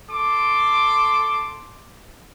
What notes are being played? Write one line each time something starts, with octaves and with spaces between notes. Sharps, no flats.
A4 C6 D6